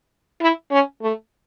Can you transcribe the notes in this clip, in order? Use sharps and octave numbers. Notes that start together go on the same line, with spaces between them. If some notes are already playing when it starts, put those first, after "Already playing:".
E4
C#4
A3